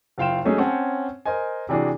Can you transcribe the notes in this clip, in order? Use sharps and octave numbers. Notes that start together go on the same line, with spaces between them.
F#1 F4 F5 G5 C6 E7
F#3 G#3 A3 C#4 D#4 G#4
C4 C#4 C5 C#5 F#5 A5
A#4 C5 D#5 G#5
C3 E3 D4 F#4 G#4